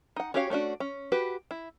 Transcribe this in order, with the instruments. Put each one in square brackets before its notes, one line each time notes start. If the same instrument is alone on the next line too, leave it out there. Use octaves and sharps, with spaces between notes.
[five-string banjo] D#4 F#5
C#4 F#4 G4 C#5 F5
A3 C#4 D4 F#4
C#4
F#4 G4 B4
E4